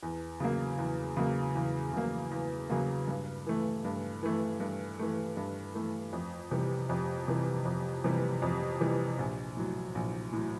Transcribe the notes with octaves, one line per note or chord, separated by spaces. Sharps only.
E2
C#3 F#3 A#3
E2
C#3 F#3 A#3
E2
C#3 F#3 A#3
E2
C#3 F#3 A#3
G2
E3 A3
G2
E3 A3
G2
E3 A3
G2
E3 A3
F2
C3 E3 G3
F2
C3 E3 G3
F2
C3 E3 G3
F2
C3 E3 G3
A#1
A2 F#3
A#1
A2 F#3